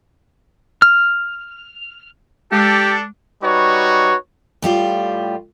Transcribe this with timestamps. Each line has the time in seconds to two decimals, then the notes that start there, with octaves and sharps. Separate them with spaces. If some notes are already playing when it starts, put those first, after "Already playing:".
0.82 F6
2.52 G#3 D4 G4 A4
3.43 G3 D#4 F#4 B4 C#5
4.62 A2 G3 F4 G4